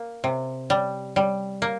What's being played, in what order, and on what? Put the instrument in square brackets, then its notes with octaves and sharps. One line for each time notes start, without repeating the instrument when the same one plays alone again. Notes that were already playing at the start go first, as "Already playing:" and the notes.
Already playing: [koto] A#3
C3
G3
G3
A#3